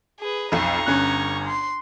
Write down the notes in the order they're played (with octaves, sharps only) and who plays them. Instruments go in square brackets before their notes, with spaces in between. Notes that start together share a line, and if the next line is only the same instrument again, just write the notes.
[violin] G#4 B4
[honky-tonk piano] B1 F2 [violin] A#5 C#6
[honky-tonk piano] G1 C#4 F#6
[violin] C6